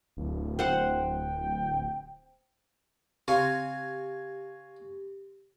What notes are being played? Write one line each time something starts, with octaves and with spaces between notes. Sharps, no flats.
D1
C5 F#5 G5
C#3 C4 G4 C#5 F5 G#5